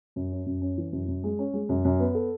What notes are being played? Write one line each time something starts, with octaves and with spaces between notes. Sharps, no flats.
F#2
C#4
F#2
C#4
E3
F#2
F#2
G#3
C#4
G#3
F#2
F#2
B3
A4